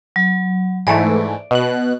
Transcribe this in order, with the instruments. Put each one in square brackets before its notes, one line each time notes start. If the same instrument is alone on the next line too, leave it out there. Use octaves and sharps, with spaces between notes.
[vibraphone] F#3
[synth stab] G#2 E3 A3 [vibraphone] D5
[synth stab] B2 F#6